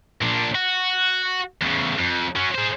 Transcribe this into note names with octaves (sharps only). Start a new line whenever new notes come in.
A#2 D4
F#4
E2 C#3
F2
F#3 C#4
G#4 C5